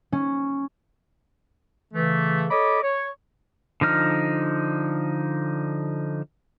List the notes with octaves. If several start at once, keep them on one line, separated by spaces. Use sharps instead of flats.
C#4
C#3 E3 A3
A4 C#5 D#5 B5 D6
C#5
D3 F3 D#4 F6